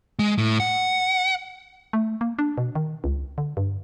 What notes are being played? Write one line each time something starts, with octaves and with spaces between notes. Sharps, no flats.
G#3
A2
F#5
A3
A#3
D4
B2
D#3
C#2
D3
G2